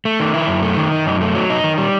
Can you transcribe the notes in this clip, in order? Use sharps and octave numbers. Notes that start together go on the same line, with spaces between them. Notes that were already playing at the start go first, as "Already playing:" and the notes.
A3
D#3
E4
F#2
A3
D#3
D#4
F#2
A3
F#3
D#4
D#3
G3